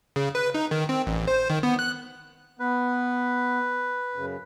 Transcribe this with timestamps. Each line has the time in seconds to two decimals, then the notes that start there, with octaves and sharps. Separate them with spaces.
0.16 C#3
0.35 B4
0.55 D#4
0.71 D#3
0.89 C4
1.07 A1
1.27 C5
1.50 D#3
1.63 B3
1.79 F#6
2.59 B3 B4
4.16 F#2 C#3